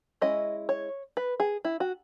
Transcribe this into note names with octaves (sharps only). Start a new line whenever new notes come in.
G#3 C#4 E4 D#5
C#5
B4
G#4
E4
F#4